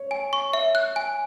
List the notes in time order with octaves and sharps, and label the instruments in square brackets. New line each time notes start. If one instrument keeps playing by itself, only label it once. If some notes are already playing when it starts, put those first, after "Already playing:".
Already playing: [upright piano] C#5
[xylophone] G#5
C#6
E5
F#6
G#5